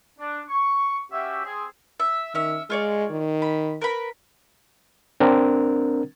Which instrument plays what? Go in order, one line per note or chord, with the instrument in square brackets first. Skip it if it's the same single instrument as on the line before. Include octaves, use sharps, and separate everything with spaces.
[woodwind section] D4
C#6
C#4 F#4 G4 E5
C4 G#4
[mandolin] E5
[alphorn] D#3 [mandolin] C#4 E5
[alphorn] G#3 [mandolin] F4 C#5 D5
[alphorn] D#3
[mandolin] B5
A#4 B4 B5
[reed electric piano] C4 D4 A#4